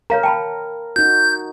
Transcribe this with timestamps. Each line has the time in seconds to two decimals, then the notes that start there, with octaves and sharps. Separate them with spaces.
0.10 A#4 C#5 F5 A#5
0.23 G5 A5 B5
0.96 D#4 F#4 G6